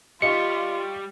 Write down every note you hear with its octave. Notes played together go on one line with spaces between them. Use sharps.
G3 F4 D#5 F5 C#6 C#7